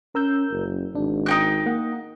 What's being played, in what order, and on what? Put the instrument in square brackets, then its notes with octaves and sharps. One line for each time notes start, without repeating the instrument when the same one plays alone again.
[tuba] C#4 [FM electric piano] A#4 E6 G6
[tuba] F#1
[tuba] G#1 [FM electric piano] D4
[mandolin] D#4 G5 F#6
[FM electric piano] A#3 F#5